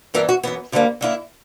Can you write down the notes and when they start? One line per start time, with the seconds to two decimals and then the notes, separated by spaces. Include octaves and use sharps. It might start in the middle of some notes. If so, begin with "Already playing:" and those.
0.14 G2 E3 B3 E4 A#4
0.29 F#4
0.43 F#2 E3 B3
0.72 D2 D3 G3 A#3
1.01 D3 A#3 E4